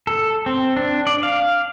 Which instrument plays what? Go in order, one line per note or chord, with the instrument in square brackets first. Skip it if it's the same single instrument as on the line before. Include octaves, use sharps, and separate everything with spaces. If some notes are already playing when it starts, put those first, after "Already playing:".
[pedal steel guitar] A4
C4
D4
D5
F5